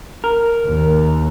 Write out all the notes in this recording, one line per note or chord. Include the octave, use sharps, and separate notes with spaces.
A#4
D#2